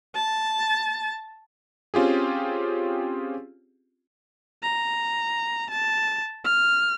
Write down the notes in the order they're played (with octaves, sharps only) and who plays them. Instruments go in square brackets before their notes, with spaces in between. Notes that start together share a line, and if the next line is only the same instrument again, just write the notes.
[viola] A5
[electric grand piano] C4 C#4 F4 G4 G#4
[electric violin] A#5
A5
F6